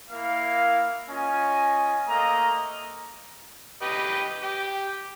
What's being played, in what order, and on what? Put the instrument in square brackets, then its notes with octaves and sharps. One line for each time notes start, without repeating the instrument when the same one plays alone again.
[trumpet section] A#3 E4 F5
C#4 F4 D#5 G#5
A3 A#3 D#5 F5 A#5
[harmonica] G4 B4 D#5
G4